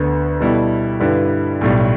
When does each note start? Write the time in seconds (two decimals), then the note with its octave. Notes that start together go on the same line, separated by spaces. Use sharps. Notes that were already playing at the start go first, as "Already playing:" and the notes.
Already playing: D2 D3 B3
0.40 B2 G3 E4 A4
1.00 G2 D3 G3 E4 B4
1.61 B1 A2 G3